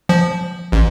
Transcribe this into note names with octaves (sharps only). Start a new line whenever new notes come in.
F3
A1